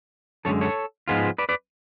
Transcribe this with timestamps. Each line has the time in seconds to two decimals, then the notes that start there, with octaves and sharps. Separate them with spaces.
0.45 F#2 D3 G#3 A4 C#5
0.61 A4 C#5
1.08 G#2 F3 G#3 B3 F4
1.38 B4 D5
1.49 B4 D5